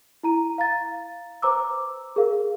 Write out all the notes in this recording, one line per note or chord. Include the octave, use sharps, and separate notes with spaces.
E4 A#5 D#7
F5 A#5 A6
B4 C5 A#5 D6 E6
G#4 A#4 F5